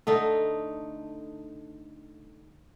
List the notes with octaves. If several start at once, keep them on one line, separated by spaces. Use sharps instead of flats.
D3 A3 D#4